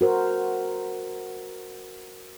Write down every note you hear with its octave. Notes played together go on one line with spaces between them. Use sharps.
F#4 A#4 C5